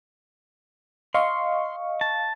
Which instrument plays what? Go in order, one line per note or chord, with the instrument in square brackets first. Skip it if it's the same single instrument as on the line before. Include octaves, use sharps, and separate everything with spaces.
[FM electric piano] D#5 F5 C#6 [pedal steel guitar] C6
[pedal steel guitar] A5